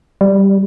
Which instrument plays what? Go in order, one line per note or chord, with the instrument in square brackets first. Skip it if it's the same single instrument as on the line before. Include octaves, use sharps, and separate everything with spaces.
[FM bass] G3